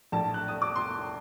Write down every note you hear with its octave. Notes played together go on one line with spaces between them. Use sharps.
A#1 A2 A5
F#6
D#6
D6
C6